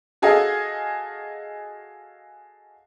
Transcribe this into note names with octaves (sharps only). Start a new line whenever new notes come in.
F#4 G#4 A4 D#5 F5